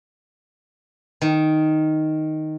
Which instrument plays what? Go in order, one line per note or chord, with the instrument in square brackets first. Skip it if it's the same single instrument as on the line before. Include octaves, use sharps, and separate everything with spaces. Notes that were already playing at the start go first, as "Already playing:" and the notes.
[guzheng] D#3